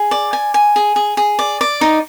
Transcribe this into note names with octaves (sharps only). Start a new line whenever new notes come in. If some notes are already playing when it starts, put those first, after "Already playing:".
Already playing: G#4
D5
G#5
G#5
G#4
G#4
G#4
D5
D5
D#4